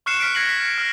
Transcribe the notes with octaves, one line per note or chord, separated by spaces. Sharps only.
C#6 F6 F#6 C7 C#7 E7
F6 B6 C#7 D7
G#6 A#6 C7 F#7
B6 C#7
A#6
F6 A#6